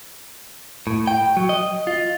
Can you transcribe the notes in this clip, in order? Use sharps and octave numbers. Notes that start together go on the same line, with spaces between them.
A2
G5
F#3
D#5
F4